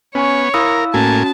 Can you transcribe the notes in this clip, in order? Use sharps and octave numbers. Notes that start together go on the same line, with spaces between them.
B3 C#4 C#5 G#5 C#6
E4 A#4 F5 B5 D#6 E6
A2 A#3 C#4 F#4 G#5 A5